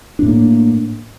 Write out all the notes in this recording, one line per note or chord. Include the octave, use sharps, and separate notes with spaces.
A2 A#3 D4